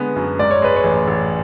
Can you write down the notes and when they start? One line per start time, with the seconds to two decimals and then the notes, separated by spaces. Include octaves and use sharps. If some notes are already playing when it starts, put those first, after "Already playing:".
Already playing: D3 G#3 B3
0.16 F#2
0.39 G#2 D5
0.51 C#5
0.62 G#3 B4
0.76 C#5
0.84 A1
1.08 A1